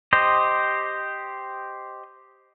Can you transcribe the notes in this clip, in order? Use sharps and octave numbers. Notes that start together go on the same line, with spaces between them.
G4 C5 D#5